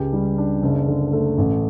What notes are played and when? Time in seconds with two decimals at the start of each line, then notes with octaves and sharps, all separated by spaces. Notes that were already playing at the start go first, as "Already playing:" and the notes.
Already playing: C#2 G4
0.13 G3
0.38 D4
0.63 F#1
0.88 D3
1.13 A3
1.38 A1